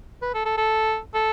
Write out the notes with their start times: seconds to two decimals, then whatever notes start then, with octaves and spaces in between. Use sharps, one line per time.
0.22 B4
0.34 A4
0.45 A4
0.57 A4
1.14 A4